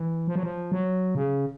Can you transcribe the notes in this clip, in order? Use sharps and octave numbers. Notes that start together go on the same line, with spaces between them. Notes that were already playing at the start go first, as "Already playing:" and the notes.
Already playing: E3
F3
F#3
F3
F#3
C#3